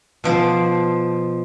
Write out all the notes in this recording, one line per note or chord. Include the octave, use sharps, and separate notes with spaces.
B2 F3 C5 D5